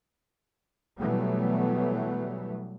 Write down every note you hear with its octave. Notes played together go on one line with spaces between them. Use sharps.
B2 E3 F#3 G3 A3 B3